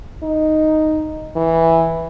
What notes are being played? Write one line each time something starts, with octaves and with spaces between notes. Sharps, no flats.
D#4
E3